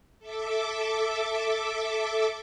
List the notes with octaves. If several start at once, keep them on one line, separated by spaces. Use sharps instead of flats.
A4 E5 D6